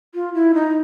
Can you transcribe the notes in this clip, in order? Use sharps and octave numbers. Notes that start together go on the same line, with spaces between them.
F4
E4
D#4